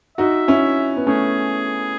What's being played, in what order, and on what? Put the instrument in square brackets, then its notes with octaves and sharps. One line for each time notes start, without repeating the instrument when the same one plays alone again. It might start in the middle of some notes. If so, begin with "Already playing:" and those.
[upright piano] D#4 F#4 [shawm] E5
[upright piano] C#4 E4
B3
[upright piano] A3 C#4 [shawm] G#4